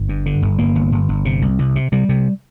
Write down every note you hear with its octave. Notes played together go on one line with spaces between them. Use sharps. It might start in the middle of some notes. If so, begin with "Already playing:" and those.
Already playing: G1
G2
D3
G1
G1 A#3
G1
G1
G1
C3
C2
C2
C3
C3 G3
C3